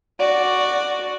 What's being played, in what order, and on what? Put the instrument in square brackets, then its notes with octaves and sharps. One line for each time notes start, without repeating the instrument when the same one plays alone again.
[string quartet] F#4 D5